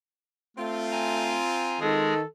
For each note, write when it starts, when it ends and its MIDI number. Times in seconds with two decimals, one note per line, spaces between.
0.57 1.41 57
0.57 2.13 60
0.57 2.13 65
0.92 1.79 80
0.92 1.79 82
1.81 2.22 51
1.81 2.14 56
1.81 2.14 68
1.81 2.25 69